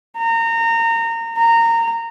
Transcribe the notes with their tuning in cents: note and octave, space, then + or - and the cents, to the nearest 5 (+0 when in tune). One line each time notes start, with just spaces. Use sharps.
A#5 -25
A#5 -20